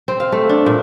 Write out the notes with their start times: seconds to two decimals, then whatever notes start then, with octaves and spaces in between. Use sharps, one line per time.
0.08 C4
0.20 F5
0.32 A3
0.49 D4
0.66 A#2